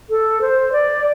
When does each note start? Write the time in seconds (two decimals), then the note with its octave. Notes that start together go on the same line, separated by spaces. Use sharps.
0.10 A4
0.41 C5
0.72 D5